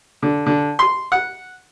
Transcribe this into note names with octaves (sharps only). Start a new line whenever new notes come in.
D3
D3
C6
F#5